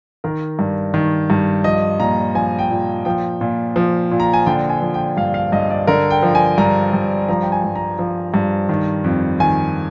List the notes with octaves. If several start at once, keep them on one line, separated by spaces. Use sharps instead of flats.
D#3 A#4
G2
D#3
G2
F3 D#5
A#2 A#5
F3 G#5
G5
A#2
F3 G5
A#2
F3
A#2
A#5
G#5
D3 G5
G#5
F3
G5
G2 F5
F5
G2 D#5
D5
D3 A#4
G5
F3
G#5
G2 A#5
G2
F3 A#5
G5
G#5
G2
A#5
F3
G2
D#3
F2
D#3 G#5